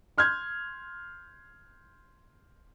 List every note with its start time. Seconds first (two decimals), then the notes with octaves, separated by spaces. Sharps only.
0.18 C6 F6 G6 G#6